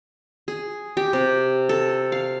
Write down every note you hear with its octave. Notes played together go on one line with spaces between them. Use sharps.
G#4
G4
C3
A4
F5